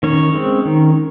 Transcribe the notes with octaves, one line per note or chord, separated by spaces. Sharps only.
D#3 C#4 C#5
G#3 C4
D#3